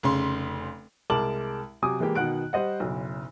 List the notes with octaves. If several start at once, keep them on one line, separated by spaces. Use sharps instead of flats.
F1 C#3 C6
C2 G#3 A#4 A5 D6 F#7
C3 F#3 G#5 D6 D#6
E3 G#3 A#3 G4
B2 D#3 F#5 F#6 D7
G3 C5 D#5 F#5
F#1 B1